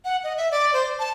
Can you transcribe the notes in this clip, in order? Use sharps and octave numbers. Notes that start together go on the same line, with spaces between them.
F#5
D#5
E5
D5
C5
A5